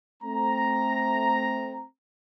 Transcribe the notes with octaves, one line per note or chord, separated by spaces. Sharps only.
A3 C4 A#5